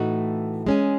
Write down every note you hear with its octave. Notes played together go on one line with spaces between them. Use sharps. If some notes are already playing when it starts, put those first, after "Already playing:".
Already playing: A2 E3 A3 D#4 F#4
G#3 C#4 G#4